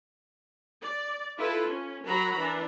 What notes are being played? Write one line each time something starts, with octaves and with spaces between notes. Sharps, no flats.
D5
E4 F4 A4 B4
C#4
F#3 F#4 A#4 A#5 B5
E3 D4